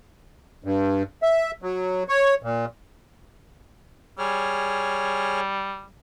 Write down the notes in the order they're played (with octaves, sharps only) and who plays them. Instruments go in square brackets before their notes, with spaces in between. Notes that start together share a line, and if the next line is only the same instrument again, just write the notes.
[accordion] G2
E5
F#3
C#5
A#2
[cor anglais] G3 [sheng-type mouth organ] G#4 C#5 F6